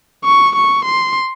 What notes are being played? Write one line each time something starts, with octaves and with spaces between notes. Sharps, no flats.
C#6
C#6
C6